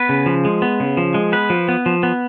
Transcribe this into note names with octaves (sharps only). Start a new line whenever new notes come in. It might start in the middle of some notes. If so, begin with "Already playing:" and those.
Already playing: B3 B4
C#3
F3
G#3
B3
C#3
F3
G#3
B3 B4
F3
B3
F3
B3